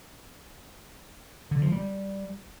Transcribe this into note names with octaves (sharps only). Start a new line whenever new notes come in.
D3
F3
G3